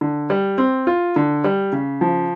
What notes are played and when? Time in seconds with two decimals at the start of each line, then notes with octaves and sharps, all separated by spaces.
0.01 D3
0.30 G3
0.58 C4
0.87 F4
1.16 D3
1.44 G3
1.73 C#3
2.01 F3